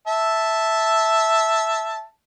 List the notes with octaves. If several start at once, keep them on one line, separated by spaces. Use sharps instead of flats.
E5 A5